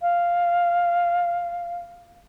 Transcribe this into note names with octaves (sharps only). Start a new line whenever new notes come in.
F5